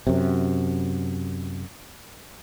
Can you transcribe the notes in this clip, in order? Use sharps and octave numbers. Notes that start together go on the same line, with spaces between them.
F#2 C3